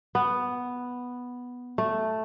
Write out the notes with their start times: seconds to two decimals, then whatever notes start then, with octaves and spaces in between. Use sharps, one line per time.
0.15 B3
1.78 A3